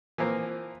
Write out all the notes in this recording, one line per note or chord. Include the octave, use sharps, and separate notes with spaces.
E3 F3 A#3 C4